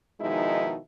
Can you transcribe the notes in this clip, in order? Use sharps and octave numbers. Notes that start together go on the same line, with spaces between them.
B2 D#3 F3 G#3 D#4 E4